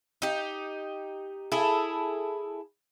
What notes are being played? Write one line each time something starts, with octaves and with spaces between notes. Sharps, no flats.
D#4 G4
E4 G#4 A4